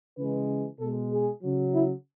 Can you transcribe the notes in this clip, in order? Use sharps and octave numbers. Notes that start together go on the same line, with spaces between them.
C#3 E3 G#3 B4
B2 G#3 A4
G#4
C#3 F#3
E4